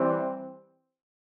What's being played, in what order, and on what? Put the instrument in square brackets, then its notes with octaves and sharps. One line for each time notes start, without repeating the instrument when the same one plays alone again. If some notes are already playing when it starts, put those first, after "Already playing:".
Already playing: [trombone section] E3 G3 C4